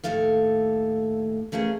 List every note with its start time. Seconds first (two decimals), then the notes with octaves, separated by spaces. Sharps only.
0.04 D#2 A2 F3 A3 A4 F5
1.52 E3 A3 A#3 C#4 G#4